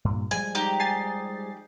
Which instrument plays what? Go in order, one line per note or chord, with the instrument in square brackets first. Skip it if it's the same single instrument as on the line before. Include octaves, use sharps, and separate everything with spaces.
[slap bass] G2 A#2
[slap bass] F3 G3 G#3 [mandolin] G#5
[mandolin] D#4 G4
[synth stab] G#5 A6 C7